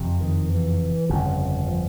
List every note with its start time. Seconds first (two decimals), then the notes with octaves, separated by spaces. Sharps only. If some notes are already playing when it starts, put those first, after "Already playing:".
Already playing: F#1 F2 C3
0.20 D#3
0.50 E3
1.09 G1 F2 C#3
1.68 F3